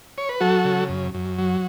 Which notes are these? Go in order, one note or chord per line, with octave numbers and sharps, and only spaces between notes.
C#5
B4
F#3 F#4 A4
C#3
F#2
F#2
F#3